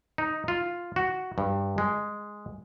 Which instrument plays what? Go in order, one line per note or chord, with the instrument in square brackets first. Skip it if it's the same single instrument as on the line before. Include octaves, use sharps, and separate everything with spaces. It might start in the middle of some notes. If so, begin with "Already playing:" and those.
[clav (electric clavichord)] D#4
F4
F#4
G2
G#3